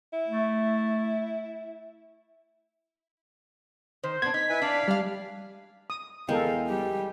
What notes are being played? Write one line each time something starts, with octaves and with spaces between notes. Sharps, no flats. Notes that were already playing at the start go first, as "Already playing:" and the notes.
E4
A3
D#3 C5
B3 D4 G#6
D#4 B6
E4 B4 G#5
D4 D5 F5
G3 D4 F5 F6
D#6
E2 G#3 A4 A#4 F5 G5
G3 G4